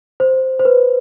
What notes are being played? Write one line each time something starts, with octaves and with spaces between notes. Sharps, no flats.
C5
C5
B4